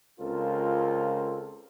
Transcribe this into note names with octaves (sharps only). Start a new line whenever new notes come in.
C#2 C4 F4 A4 A#4